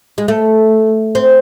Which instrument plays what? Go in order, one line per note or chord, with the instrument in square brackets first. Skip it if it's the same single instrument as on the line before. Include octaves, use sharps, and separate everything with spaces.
[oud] G#3
A3
C4